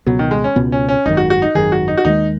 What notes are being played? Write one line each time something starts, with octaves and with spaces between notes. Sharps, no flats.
C#2 B2 F#3 B3
D#3
G#3
C#4
C#2 B2 B3
C#4
C#4
G#1 F#2 D#3 D#4
F#4
F#4
D#4
G#1 F#2 D#3 G#4
F#4
D#4
F#4
D#2 D#3 G#3 D#4